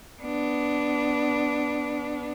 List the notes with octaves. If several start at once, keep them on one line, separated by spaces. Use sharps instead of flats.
B3 D4